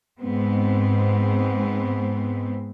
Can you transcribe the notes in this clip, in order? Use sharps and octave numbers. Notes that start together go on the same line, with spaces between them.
G#2 G#3 B3 C4